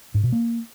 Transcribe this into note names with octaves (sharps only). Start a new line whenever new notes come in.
G#2
B2
A#3